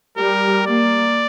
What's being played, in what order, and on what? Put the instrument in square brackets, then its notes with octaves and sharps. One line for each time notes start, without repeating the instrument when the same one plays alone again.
[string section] G3 [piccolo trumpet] A#4
[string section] A#3 [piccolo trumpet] D5